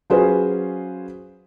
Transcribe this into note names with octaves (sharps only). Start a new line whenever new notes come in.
F#3 C#4 F4 G#4 B4 C5